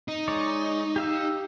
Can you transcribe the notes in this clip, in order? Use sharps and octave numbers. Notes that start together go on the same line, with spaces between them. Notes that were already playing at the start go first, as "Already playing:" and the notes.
D#4
G#3 C#5 D5
G4 F5 E6